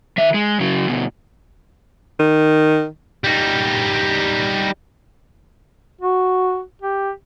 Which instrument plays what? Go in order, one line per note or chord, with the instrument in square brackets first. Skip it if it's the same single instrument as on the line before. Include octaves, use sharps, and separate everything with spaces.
[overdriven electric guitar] D#3 E5
G#3
C#3 F#3
D2 B2
[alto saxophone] D#3
[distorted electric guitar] G3 D#4
[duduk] F#4
G4